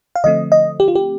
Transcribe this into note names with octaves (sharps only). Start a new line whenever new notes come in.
F5
D3 F3 A3 C4 D#5
D#5
G4
F4
G4